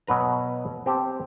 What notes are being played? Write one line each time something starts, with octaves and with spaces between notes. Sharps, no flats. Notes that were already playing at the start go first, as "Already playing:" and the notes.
B2 F#3 B4 A#5
C4 G4 A5